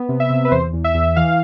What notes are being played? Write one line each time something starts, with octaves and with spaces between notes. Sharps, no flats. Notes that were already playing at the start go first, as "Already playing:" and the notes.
Already playing: B3
C3
E5
C3
B4
E2 C5
E2
E5
E2
E3 F5